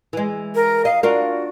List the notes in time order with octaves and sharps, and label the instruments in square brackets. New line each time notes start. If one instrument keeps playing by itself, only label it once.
[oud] E3 G#3
[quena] A#4
[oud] D#5 [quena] F5
[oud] D4 F4 A#4 [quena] F#4